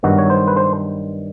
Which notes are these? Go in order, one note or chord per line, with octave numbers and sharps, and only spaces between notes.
G2 D#3 F#3 B3 F#4
C#5
C5
B4
C5